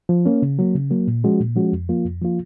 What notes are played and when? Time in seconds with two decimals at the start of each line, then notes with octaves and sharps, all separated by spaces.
0.09 F3
0.26 A#3 C#4
0.42 C#3
0.59 F#3 A#3
0.75 C#3
0.91 F#3 A#3
1.07 A#2
1.24 F3 G#3 C#4 F#4
1.40 A#2
1.56 F3 G#3 C#4 F#4
1.73 F2
1.89 F3 A#3 F4
2.05 F2
2.22 F3 A#3 F4